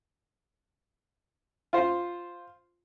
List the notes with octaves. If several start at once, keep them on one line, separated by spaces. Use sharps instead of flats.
F4 C5